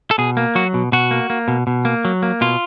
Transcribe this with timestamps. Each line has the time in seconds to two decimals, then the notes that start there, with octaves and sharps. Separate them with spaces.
0.11 A4
0.18 B2 G#4
0.37 A#3
0.55 F#3 F#4
0.74 B2
0.92 B2 F#4
1.11 A#3
1.30 A#3
1.48 B2
1.67 B2
1.85 A#3
2.05 F#3
2.23 A#3
2.41 B2 F4